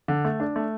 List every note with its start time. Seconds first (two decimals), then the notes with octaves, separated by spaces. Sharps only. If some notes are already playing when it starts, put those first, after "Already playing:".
0.08 D3
0.25 A3
0.40 D4
0.56 A3